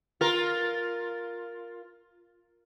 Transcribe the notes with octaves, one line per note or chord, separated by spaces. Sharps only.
F4 A#4